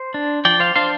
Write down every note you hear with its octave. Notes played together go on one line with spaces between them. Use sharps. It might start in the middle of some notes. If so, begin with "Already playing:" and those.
Already playing: C5
D4
F3 D5 G5
C5 F5
D4 C5 F5